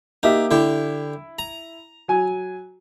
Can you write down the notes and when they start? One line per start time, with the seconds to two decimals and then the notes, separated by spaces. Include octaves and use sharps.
0.23 A#3 D#4 G4 E5
0.51 D3 E4 G4
1.39 A#5
2.08 F#3 G#5